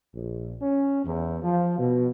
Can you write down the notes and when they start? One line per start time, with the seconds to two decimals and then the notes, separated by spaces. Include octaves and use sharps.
0.15 A#1
0.61 C#4
1.04 E2
1.43 F3
1.78 B2